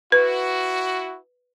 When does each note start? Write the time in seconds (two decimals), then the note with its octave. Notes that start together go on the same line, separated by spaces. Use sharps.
0.12 E4 F#4 B4